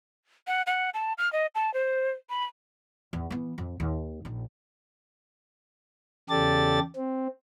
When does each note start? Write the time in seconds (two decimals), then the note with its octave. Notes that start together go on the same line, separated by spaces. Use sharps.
0.47 F#5
0.67 F#5
0.94 A5
1.18 F6
1.33 D#5
1.55 A5
1.74 C5
2.30 B5
3.13 E2
3.30 E3 B3
3.58 F2
3.80 D#2
4.25 A#1 D#4
6.30 E2 C#3 G4 A4 D5 A6
6.96 C4